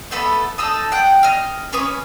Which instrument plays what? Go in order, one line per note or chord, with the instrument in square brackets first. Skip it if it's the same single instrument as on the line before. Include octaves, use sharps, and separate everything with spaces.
[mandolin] A3 B3 A4 B5
D#4 A4 D#6
F#5 G5
D#5 F6
C#4 B4 C#5 D#6